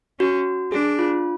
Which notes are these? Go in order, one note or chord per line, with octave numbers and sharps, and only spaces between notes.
C#4 F#4
D4 G#4
F4